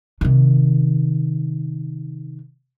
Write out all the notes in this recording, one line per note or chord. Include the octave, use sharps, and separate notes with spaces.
C3 D#3